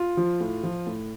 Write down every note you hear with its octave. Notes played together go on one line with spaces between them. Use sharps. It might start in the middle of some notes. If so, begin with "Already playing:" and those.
Already playing: F4
F3
A2
F3
A2